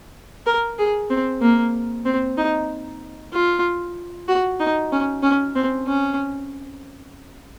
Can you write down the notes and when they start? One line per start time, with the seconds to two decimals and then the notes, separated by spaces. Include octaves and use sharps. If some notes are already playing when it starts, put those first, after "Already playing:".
0.46 A#4
0.78 G#4
1.10 C4
1.41 A#3
2.05 C4
2.37 D#4
3.32 F4
4.28 F#4
4.60 D#4
4.92 C#4
5.23 C#4
5.55 C4
5.87 C#4